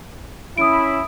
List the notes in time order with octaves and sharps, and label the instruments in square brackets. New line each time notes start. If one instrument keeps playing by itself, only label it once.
[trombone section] C#4 E4 [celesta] D#6 D7